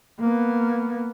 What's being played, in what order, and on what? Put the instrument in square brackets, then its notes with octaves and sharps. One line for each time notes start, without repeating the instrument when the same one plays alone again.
[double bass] A#3 B3